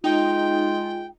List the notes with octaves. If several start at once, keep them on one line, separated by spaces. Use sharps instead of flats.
G#3 D#4 F4 G5